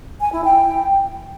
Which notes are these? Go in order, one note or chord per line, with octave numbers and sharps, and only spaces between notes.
G#5
E4
G5